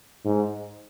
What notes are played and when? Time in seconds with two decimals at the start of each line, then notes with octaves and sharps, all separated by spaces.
0.25 G#2